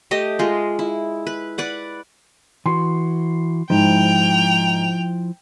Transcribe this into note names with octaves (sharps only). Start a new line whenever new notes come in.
A3 G4 D#5
G#3 F4
E4
B4
B4 D5 F#5
E3 F#4 C6
G#2 F3 E4 G5 F7